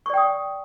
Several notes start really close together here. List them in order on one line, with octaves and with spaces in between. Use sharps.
C#6 D5 G5 D#6